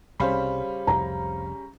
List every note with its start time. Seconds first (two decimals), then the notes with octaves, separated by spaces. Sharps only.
0.20 C2 C#3 G3 C#4 C5 F5 B5
0.87 F1 C2 F2 A#5